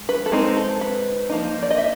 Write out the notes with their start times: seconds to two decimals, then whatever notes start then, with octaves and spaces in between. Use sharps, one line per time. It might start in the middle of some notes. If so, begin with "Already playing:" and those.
Already playing: G#3
0.09 B4
0.26 A4
0.32 G#3 C4 D#4 A#4
0.57 A4
0.81 B4
1.29 F3 A#3 D#4
1.63 D5
1.70 D#5
1.78 E5